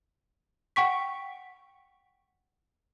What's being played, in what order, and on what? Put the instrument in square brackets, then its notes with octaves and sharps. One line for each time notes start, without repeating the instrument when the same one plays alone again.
[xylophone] F#5 G5 C#6 B6